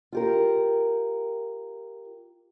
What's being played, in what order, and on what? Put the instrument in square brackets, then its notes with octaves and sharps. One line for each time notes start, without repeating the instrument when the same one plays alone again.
[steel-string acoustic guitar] F4 G4 A#4